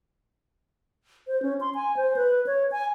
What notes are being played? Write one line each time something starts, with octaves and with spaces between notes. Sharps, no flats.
C5
C#4
C6
G#5
C5
B4
C#5
G#5